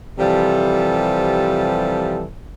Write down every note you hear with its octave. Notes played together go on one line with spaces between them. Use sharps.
C3 E3 F3 G3 A4